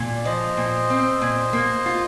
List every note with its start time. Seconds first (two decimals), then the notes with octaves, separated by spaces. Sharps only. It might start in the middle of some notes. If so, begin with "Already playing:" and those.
Already playing: A#2
0.16 D5
0.25 F3 C5 D#5
0.57 A#2
0.90 C4
1.21 A#2
1.53 A#3
1.86 F4